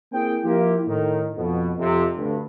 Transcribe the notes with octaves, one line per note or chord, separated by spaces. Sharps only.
A#3 C4 E4 G#4 G5
F3 A#3 E4 F4 G4
A2 D#3
F2 B2
F2 C3
D2 G2